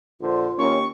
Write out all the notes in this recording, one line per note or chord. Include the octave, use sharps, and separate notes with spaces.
A#1 D3 F4 C5
D#2 A#3 C#4 C#6